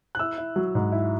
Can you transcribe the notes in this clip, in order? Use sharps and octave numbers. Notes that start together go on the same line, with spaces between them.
F#6
E4 E6
E4
F#3
G#2
E4